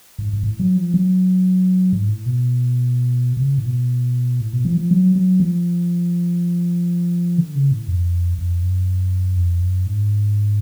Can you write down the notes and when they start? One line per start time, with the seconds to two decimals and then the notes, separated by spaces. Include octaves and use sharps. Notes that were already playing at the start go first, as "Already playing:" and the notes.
0.19 G#2
0.33 G#2
0.43 A2
0.60 F#3
0.77 F3
0.94 F#3
1.93 G#2
2.08 A2
2.26 B2
3.37 B2
3.41 C#3
3.58 A2
3.66 B2
4.41 A2
4.53 B2
4.65 F3
4.77 F3
4.91 F#3
5.16 F#3
5.40 F3
7.38 D3
7.55 C#3
7.72 A2
7.88 F2
8.38 F2
8.63 F#2
9.37 F2
9.62 F#2
9.86 G#2